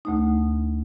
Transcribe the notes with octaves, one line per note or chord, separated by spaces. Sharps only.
D2 A3 D#4